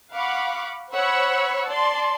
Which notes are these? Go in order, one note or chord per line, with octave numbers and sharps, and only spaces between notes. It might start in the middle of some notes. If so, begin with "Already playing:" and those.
F5 F#5 B5 C#6 D6
C5 C#5 F#5 B5 C#6 E6
D5 A5 C6